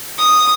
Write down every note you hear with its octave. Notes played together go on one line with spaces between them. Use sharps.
D#6